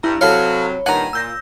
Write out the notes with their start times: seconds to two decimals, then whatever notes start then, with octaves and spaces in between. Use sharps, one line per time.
0.03 G2 E4 A#5
0.21 C3 F#3 A4 C#5 F5 B5
0.86 G2 A#2 D#3 F#5 G#5 A#5
1.13 A#2 E6 G6 A#6